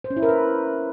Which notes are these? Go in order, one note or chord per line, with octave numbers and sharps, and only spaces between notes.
C5
C#4
E4
A#4
B4